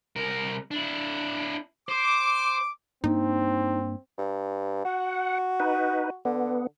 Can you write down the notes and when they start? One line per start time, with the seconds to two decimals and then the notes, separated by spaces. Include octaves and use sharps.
0.16 C2 A#4
0.71 D4 E4
1.89 C5 D6
3.04 G2 A#3 C4 D4 D#4
4.18 G2
4.85 F#4 F#5
5.60 D#4 B4
6.25 D3 B3